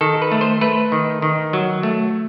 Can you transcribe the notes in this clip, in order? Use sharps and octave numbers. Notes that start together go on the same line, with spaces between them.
D#3 A4
B4
A3
C5
A3 B4
D#3
D#3
F#3
A3